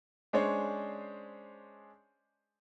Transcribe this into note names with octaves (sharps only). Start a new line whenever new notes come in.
G#3 C#4 D4 G#4 C5 C#5